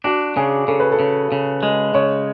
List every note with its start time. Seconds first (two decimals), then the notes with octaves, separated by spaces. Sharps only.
0.04 D4 F#4
0.36 C#3 G#4
0.68 C#3 A4
0.80 B4
0.92 A4
1.00 C#3
1.32 C#3
1.63 G#3
1.94 C#3 C#5